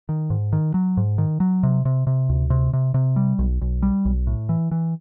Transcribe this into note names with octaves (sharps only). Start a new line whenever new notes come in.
D#3
G#2
D#3
F#3
G#2
D#3
F#3
C3
C3
C3
D2
C3
C3
C3
G3
B1
B1
G3
B1
A2
E3
E3